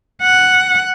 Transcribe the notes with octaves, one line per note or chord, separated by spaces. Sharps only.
F#5